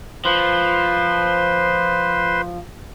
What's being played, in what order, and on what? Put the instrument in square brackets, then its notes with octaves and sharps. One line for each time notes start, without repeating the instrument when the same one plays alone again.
[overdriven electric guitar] F3 [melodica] B4 C5 C6